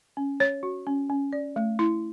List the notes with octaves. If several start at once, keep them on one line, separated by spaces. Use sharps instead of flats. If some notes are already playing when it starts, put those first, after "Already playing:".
C#4
C#5
F#4
C#4
C#4
D5
A3
E4